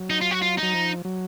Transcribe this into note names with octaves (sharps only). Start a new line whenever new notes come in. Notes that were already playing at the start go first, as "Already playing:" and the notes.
Already playing: F#3
D#4
F4
F#4
F4
D#4
F#3
F3
F#3